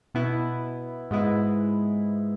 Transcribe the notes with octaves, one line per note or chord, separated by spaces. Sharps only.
B2 B3 E4
G#2 G#3 B3 E4